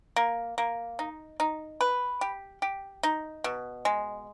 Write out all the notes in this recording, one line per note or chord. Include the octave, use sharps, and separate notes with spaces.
A#3
A#3
D#4
D#4
B4
G4
G4
D#4
B2
G#3